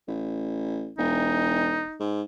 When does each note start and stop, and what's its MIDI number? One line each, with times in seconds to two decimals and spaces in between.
0.08 0.91 33
0.98 1.85 28
0.98 2.00 63
2.00 2.22 44